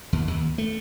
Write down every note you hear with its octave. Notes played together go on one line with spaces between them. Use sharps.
D#2
D#2
A3